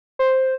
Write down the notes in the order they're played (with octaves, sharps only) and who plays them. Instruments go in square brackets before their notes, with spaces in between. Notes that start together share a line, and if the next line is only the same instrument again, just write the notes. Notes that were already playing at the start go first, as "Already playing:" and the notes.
[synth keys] C5